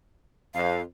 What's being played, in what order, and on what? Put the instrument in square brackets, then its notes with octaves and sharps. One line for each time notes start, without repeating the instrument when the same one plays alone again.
[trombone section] F2 [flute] F5